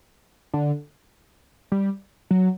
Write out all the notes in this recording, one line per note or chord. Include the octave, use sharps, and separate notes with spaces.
D3
G3
F#3